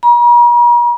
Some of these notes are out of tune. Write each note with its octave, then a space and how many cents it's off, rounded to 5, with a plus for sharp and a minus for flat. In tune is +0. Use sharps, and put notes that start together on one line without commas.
A#5 +45